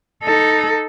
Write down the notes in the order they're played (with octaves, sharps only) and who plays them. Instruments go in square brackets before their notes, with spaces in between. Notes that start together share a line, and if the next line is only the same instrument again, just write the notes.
[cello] D#4 A4